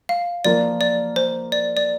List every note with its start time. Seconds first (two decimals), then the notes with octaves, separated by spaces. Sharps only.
0.09 F5
0.45 F3 A#3 F4 A#4 D5
0.81 D5
1.16 C5
1.52 D5
1.77 D5